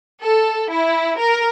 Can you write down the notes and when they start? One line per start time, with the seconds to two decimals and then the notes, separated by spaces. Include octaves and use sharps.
0.22 A4
0.71 E4
1.18 A#4